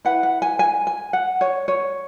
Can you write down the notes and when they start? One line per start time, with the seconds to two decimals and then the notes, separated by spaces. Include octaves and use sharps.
0.05 E4 B4 F#5
0.23 F#5
0.42 G#5
0.59 G#5
0.87 G#5
1.13 F#5
1.41 C#5
1.68 C#5